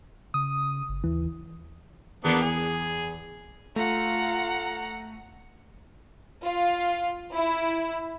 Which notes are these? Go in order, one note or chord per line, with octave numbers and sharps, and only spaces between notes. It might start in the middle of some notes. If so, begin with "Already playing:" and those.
C#3 D#6
G1
D#2 E3
E2 A#3 B3 D4
G#4
A3 F4 F#5 A#5
F4
E4